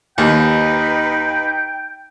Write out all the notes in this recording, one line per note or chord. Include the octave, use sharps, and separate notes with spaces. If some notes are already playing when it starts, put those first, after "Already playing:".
D#2 D#4 B4 G5